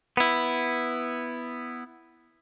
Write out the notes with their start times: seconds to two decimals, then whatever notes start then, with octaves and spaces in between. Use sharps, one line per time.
0.17 B3 E4